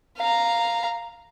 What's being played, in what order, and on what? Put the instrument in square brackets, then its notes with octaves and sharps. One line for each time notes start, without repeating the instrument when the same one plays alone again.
[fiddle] F5 A#5